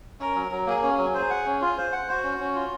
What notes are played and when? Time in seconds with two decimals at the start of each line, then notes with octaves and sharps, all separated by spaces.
0.20 C#4 A#4
0.35 F#3
0.52 F#3
0.67 A#3 G#4
0.82 C#4
0.98 F#3
1.14 G#4 C5
1.30 F#5
1.46 C#4
1.61 F4
1.77 C5
1.93 F#5
2.08 F#4 C5
2.24 C#4
2.40 C#4
2.55 F4